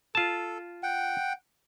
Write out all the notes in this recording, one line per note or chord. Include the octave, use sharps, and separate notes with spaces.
F4 A4 A5
F#5 G5